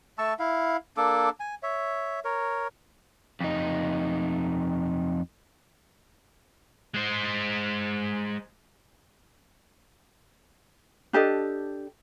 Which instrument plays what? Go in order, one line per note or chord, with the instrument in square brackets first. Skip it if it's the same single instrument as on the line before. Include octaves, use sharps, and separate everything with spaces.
[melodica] A3 A5 C#6 E6
E4 F5
A#3 D4 A4 D6
G#5
C#5 E5
A#4 C#5
[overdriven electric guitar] F2 D#4
[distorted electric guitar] G#3 C5
[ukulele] D4 G4 A4 D#5